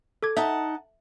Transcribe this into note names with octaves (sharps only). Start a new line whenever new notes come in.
A4 D6 G#6
D#4 E5 F#5 A5